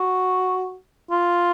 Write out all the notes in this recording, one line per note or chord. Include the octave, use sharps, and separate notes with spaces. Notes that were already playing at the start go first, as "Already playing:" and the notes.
Already playing: F#4
F4